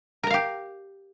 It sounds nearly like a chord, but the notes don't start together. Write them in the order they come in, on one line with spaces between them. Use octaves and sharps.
A#4 A#5 F5 G4